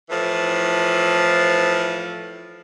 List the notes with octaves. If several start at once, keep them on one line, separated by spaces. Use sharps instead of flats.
A2 E3 F3